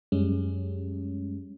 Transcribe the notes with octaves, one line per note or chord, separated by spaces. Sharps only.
F#2 G3 G#3 C#4